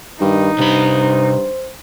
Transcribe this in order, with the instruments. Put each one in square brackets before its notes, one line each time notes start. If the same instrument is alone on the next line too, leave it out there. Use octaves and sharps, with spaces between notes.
[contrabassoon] G2 [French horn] D#3 [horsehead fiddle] D#4
[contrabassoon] G2 [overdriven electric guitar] C3 B5 [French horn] C5